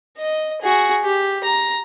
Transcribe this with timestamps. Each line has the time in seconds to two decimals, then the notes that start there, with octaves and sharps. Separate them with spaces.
0.18 D#5
0.62 F#4 G#4
1.04 G4
1.44 A#5